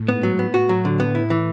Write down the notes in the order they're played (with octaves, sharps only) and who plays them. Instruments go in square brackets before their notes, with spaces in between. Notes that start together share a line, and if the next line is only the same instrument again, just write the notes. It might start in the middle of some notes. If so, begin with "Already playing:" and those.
Already playing: [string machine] A2
[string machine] G#2 [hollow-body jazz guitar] B3
[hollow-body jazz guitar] F#3
[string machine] A2 [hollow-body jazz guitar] B3
[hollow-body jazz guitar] F#4
[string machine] A2 [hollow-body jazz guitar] F#3
[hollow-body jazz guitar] D3
[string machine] A2 [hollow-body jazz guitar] B3
[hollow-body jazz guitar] E4
E3